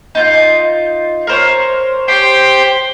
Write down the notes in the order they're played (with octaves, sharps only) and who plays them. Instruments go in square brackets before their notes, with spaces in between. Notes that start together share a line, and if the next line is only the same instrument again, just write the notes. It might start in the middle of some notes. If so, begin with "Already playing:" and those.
[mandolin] D#4 F4 G6
A#4 C5 C#5
[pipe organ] G4 C5 G5 [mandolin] C6